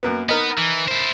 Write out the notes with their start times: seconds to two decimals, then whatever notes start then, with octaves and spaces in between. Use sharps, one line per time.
0.03 F#2 A#3 B3
0.29 B3 D#4 A#4 D#5
0.58 E3
0.88 E4 C5